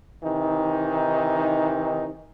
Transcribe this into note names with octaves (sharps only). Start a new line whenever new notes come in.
C3 D#3 E3 D#4